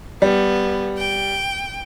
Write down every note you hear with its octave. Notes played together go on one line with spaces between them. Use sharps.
G3 B3
G5